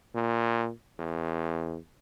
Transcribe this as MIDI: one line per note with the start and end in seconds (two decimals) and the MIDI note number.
0.15 0.70 46
0.99 1.77 40